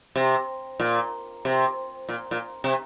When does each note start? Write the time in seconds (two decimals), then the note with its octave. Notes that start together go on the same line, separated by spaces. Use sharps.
0.15 C3
0.80 A#2
1.45 C3
2.09 A#2
2.31 A#2
2.64 C3